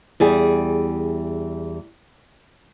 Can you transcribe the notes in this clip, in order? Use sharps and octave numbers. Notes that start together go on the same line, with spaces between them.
E2 G3 G#4